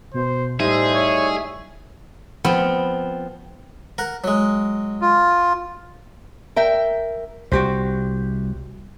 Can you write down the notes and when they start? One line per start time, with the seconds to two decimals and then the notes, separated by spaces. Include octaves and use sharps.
0.14 B2 C5
0.60 A2 G3 D#4 G#4 C5 E5
0.94 C#5
2.44 F3 B3 C4
3.98 A#4 F#5
4.24 F#3 G#3
5.01 F4
6.56 A#4 E5 G5
7.52 C2 F#4 G4 C5